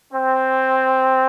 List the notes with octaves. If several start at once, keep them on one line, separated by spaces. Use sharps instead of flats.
C4